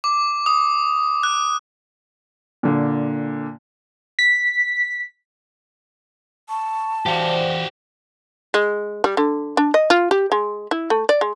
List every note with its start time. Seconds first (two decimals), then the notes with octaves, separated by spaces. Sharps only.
0.04 D6
0.46 D#6
1.23 F#6
2.63 A#2 D3
4.19 B6
6.49 A5 C#6
7.06 E3 F#4 G4 C5 D5 F5
8.54 G#3
9.04 G3
9.17 D3
9.57 D4
9.74 D#5
9.90 F4
10.11 G4
10.32 G#3
10.71 E4
10.90 A3
11.09 D5
11.21 G#3